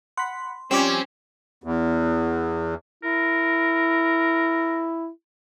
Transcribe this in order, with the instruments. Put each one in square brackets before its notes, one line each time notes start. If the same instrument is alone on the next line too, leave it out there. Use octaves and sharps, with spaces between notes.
[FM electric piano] F#5 B5 [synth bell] C6
[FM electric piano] F3 G3 G4 [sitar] C4 [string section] C#4 [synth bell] D6 E7
[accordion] E2
[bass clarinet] E4 [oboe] A#4